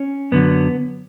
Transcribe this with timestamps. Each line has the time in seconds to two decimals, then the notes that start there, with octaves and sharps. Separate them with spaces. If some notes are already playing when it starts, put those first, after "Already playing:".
Already playing: C#4
0.32 F#2 D3 F#3 B3